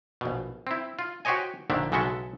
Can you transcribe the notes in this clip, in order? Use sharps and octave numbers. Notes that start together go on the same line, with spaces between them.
A#1 B2
C4 E4
F4
F#4 G4 C5 C#5 D#5 G#5
A#1 D3 D#3 D4 E5
B1 C#3 G#3 F#4 A4 E5